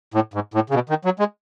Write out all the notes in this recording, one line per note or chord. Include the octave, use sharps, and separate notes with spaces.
A2
G#2
A2
C#3
B2
D#3
F#3
G#3